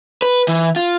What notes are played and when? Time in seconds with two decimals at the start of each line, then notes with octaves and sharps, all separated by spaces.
0.22 B4
0.48 E3
0.76 F4